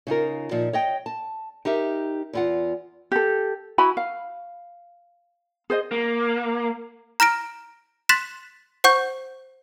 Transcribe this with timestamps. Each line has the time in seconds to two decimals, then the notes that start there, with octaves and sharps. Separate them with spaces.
0.07 C#3 D#4 F4 A#4
0.51 A#2 F3 D#4
0.73 C#5 D#5 G5
1.06 A5
1.65 D#4 G4 A#4 E5
2.33 E2 F4 F#5
3.12 G4 A4
3.78 E4 F#4 G#5 B5
3.97 F5
5.70 G#4 C5 D#5
5.91 A#3
7.20 A#5 F6 A#6 D7
8.09 C6 F#6 A6 B6 E7
8.84 C5 F#5 C#6 G6